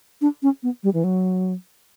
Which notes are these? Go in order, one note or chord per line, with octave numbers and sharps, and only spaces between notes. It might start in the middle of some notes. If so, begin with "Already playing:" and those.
D4
C#4
B3
G3
E3
F#3